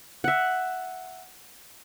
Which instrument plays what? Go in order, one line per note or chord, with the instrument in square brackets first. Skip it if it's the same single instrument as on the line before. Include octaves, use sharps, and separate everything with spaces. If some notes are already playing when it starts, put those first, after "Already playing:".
[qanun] E5 F#5